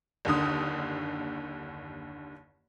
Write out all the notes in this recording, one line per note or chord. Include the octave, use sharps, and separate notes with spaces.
F#1 D#2 D3 D#6